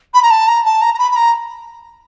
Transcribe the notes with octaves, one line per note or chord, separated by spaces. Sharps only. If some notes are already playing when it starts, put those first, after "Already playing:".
B5
A#5
A5
A#5
A5
A#5
A#5
B5
B5
A#5